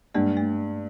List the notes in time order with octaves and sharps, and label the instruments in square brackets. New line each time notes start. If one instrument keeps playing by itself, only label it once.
[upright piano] G2 [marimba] G#3 A#3
[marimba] A3